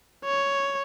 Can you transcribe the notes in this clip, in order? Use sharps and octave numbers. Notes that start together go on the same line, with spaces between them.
C#5